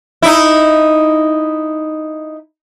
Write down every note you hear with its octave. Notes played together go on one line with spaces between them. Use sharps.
D#4 E4